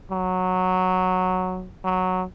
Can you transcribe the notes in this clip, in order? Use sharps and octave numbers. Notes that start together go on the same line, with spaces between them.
F#3
F#3